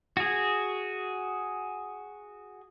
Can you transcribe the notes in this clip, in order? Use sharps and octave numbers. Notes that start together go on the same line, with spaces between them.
F#4 G#4